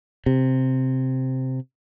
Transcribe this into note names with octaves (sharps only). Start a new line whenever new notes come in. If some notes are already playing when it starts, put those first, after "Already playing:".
C3